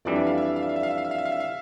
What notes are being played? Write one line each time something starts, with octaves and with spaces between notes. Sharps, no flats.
F2 E3 G3 D4 D5
E5
F5
E5
E5
F5
E5
F5
E5
F5
E5
F5
E5
F5
E5
F5
E5
F5